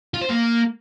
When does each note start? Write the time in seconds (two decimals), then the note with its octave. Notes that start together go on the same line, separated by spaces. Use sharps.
0.14 F4
0.21 C5
0.29 A#3